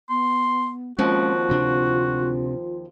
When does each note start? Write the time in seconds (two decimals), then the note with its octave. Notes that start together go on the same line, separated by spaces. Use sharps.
0.10 B3 C6
0.99 D#2 F3 G#3 C4 C#4 F4 F#4
1.49 D2 C3 D4